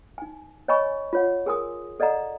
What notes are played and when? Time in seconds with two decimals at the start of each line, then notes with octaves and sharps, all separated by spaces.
0.18 D#4 G#5
0.68 C#5 D#5 G#5 B5 C#6
1.13 F4 C#5 F#5
1.46 G#4 A#4 G#5 C6 D#6
2.00 A4 D5 D#5 F#5 A#5